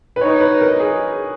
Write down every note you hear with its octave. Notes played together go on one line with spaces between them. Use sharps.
B4
D#4 C#5
B4
A#4
G#4